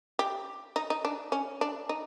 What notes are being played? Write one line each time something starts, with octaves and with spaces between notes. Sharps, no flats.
G4
D#4
D#4
D4
C#4
D4
D#4